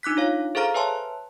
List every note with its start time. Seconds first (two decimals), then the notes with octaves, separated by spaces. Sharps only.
0.03 D4 D#4 D6 F#6 B6
0.17 F4 C#5 F5
0.55 G#4 A4 C5 F5 A#5 F6
0.74 B4 C#5 E5 G#5 A5 C6